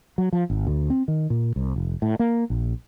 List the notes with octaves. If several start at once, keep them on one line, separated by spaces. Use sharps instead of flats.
F#3
F3
G#1
D2
C4
D#3
A#2
C2
F1
A2
A#3
A#1